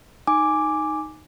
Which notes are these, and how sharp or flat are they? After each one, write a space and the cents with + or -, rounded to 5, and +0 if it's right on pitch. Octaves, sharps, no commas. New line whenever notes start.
D#4 +0 G#5 +0 D6 +0